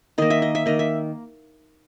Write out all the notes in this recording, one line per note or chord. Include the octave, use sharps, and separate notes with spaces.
D#3 A#3 D#5
E5
D#5
E5
D#3 A#3 D#5
E5